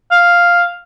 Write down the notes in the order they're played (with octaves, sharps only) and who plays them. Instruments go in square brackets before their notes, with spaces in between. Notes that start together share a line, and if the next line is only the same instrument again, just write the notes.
[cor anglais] F5